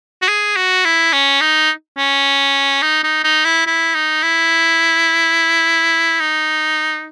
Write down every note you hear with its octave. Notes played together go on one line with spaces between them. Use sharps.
F#4
G#4
F#4
E4
C#4
D#4
C#4
D#4
D#4
D#4
E4
E4
D#4
E4
D#4